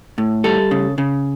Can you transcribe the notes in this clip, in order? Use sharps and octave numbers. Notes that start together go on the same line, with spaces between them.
A2
G3 A4
C#3
C#3